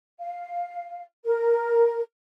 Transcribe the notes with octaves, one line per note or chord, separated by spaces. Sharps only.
F5
A#4